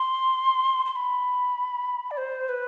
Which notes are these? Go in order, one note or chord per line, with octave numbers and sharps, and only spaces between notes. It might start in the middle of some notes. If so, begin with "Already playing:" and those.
Already playing: C6
C6
B5
D5
C5
B4